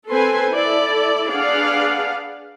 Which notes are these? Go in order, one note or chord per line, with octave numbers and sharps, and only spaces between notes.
C4 A4 B4 C5 G#5 C6
E4 A4 D5
D4 G#4 B4 D5 F5 F#5